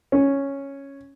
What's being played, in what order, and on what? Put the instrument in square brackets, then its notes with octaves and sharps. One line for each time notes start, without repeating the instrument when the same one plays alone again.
[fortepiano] C#4